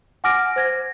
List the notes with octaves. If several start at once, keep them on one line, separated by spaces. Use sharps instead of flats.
F#5 G#5 D6 F6 A#6 D7
C5 G#6 A#6